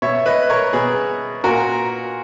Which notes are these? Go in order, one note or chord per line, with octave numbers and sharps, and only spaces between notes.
B2 C#5 E5
B4 D#5
A#4 C#5
B2 G#4 B4
A#2 F#4 A#4